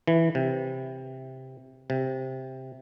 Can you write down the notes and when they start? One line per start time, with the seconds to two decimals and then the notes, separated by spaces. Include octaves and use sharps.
0.07 E3
0.35 C3
1.90 C3